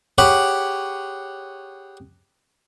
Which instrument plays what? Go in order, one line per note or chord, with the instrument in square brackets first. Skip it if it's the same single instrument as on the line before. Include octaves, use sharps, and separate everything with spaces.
[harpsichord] G4 G#4 C#5 F#5 B5